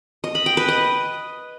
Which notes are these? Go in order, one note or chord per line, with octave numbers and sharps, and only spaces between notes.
D#5
B5
G5
B4
D#5